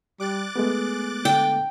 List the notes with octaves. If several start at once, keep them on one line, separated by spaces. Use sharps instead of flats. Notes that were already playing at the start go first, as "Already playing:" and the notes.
G3 D6 F#6 A6
G#3 A3 B3 G#4
D3 G5